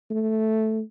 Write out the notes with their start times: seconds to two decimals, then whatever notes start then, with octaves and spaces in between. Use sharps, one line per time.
0.11 A3